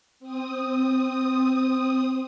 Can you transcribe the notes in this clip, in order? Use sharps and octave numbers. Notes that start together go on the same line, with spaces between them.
C4 D#6